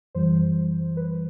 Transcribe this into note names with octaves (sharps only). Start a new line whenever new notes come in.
F#2 E3 G3 C5
B4